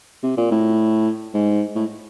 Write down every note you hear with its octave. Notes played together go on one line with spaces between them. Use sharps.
C3
A#2
A2
G#2
A2